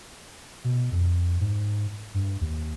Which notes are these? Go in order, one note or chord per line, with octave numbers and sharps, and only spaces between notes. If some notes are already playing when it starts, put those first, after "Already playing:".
B2
F2
G#2
G2
D#2